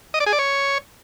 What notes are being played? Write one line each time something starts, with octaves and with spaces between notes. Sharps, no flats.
D#5
D5
G#4
D5
C#5